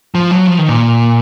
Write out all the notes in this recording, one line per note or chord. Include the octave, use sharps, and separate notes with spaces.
F3
F#3
F3
D#3
A#2